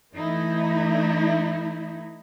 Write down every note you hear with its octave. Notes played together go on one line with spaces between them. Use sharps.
E3 A3 D#4 E4